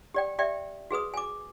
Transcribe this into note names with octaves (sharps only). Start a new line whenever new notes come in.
G4 D5 G5
G4 D5 E5 G5
F#4 G#4 B4 D#6
G#5 D6